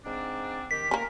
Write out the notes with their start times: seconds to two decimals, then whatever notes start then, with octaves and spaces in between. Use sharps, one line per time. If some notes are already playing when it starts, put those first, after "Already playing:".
0.04 G#2 C4 D4
0.71 D#3 G4 B6
0.91 A#3 C#4 A#4